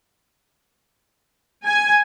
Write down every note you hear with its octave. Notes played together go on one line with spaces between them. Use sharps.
G#5